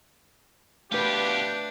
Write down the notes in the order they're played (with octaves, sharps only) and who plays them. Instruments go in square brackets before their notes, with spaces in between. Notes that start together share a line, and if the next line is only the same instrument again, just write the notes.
[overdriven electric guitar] B2 F4 [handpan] A3 B4 [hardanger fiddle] D4 [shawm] G4